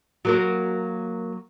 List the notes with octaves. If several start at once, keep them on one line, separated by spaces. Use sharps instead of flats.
F#3 A#3 A#4